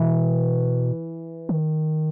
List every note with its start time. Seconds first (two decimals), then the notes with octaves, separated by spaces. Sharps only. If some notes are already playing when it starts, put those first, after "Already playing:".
Already playing: B2 E3
1.49 D#3